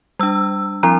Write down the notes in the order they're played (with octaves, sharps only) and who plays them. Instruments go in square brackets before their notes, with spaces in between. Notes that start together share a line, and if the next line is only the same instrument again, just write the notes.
[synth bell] G3 D4 E6
F3 C4 E4 A#5